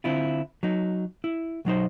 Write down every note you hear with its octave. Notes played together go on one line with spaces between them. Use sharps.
D3 C4 E4 F4
F#3 D#4
E4
B1 F#3 D#4 C5